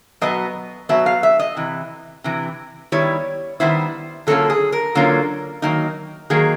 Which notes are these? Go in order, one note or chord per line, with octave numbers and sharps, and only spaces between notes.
B2 F#3 B3 D#5
B2 F#3 B3 E5
F5
E5
D#5
C3 E3
C3 E3
D#3 G3 B3 E4 C#5
D#3 G3 B3 E4 C5
D3 F#3 A#3 C#4 F4 A4
G#4
A#4
D3 F#3 A#3 C#4 F4
D#3 F#3 A#3 D#4
D#3 F#3 A#3 D#4 G#4